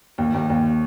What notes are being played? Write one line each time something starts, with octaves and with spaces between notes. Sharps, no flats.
D#2
D#2
D#2